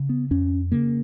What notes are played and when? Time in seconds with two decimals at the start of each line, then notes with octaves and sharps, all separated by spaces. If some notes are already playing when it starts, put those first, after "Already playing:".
Already playing: C#3
0.09 B3
0.31 F2 C#4
0.72 C#3 A#3